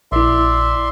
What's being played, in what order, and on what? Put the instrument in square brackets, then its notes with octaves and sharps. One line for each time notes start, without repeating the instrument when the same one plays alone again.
[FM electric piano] A#1 E4 [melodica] D5 E5 C6